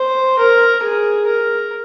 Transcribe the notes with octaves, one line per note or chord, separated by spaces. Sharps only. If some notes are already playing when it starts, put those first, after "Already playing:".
Already playing: C5
A#4
G#4
A#4